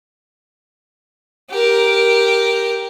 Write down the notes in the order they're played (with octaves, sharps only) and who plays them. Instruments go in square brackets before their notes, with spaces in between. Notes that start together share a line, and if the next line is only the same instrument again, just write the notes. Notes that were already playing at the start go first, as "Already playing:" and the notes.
[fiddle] G4 A#4